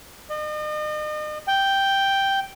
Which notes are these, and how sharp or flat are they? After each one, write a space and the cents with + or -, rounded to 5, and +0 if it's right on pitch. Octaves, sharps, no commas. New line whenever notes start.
D#5 -40
G5 +0